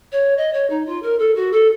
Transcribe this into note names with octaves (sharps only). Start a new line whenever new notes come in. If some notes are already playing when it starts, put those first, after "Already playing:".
C#5
D#5
C#5
D#4
F4
A#4
A4
F#4
A4